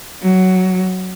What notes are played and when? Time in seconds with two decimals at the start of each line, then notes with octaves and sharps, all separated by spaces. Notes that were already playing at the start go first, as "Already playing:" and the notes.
0.22 F#3